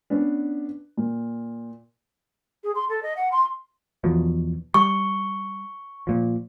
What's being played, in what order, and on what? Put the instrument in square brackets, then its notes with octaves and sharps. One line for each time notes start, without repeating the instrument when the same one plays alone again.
[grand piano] B3 C#4 D4
A#2
[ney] G#4
C6
A4
D#5
F#5
C6
[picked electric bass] E2 B2 F3
[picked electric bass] G3 [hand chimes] C#6
[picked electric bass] A#2 F3